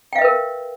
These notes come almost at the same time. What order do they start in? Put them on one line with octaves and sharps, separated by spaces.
G5 F5 E5 B4 A#4